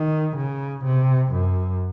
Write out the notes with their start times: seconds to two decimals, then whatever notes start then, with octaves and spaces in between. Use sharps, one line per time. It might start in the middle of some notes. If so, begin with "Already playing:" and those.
Already playing: D#3
0.36 C#3
0.84 C3
1.32 F#2